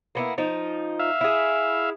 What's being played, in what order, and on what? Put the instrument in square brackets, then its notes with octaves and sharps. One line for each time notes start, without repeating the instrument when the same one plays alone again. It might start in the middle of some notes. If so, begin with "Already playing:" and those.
[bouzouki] A#3 B3 E4
F3 D#4
[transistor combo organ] E5 F5
[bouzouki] E4 G#4